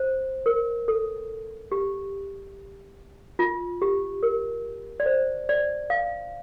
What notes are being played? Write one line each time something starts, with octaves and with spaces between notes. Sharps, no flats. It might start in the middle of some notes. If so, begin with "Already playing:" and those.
Already playing: C5
A#4
A4
G4
F4
G4
A#4
D5
C5
D5
F5